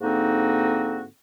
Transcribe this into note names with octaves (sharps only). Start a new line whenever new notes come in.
G#2 D3 A#3 C4 D#4 F#4